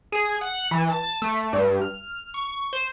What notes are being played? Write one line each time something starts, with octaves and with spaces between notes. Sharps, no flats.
G#4
F#5
E3
A5
A3
G2
F6
C#6
C5